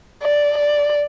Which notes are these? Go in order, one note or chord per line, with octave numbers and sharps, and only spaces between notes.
D5
D5